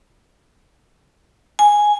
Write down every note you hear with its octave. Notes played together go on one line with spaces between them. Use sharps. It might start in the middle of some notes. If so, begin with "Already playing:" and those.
G#5